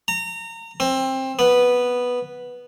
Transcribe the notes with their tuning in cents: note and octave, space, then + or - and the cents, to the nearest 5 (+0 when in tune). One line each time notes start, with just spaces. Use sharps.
A#5 -30
C4 +20
B3 -5